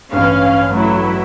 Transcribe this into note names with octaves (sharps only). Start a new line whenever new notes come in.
A1 G2 C#4 F5
F#3 A3 E4